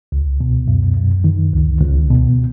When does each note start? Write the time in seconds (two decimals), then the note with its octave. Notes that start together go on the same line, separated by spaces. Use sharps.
0.12 C#2
0.41 B2
0.68 F#2
0.97 F#2
1.24 D#3
1.53 C#2
1.81 C#2
2.10 B2